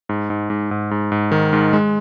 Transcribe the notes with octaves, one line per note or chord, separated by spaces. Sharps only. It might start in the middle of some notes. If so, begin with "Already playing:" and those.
G#2
G#2
G#2
G#2
G#2
G#2
D#3
G#2
G#3